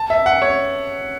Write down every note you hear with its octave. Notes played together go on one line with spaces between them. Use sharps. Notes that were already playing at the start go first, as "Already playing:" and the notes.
Already playing: A5
E5
F#5
C#5